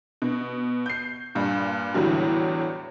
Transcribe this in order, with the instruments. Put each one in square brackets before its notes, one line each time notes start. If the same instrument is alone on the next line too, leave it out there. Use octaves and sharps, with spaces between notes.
[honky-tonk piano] B2
G6 C7
G2 A#2
E2 A2 D3 F#3 G3